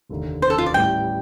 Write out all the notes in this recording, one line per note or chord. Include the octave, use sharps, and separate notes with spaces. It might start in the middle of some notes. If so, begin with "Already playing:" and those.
F1 D#2 D3 A3 D#4
C5
A4
F4
D5
A1 A2 G3 G5